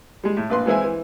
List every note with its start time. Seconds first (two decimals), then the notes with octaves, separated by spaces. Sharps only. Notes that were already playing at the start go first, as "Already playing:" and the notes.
0.23 G3 G#3
0.37 A2
0.50 A#1 B4 C6
0.66 E3 G#3 C4 E4 G#5
0.84 E3